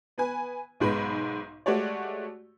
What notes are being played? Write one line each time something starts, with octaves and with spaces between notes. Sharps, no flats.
B3 B4 G#5
B1 G#2 G#3 B3 B5
G#3 A3 F#4 G4 C#5 D5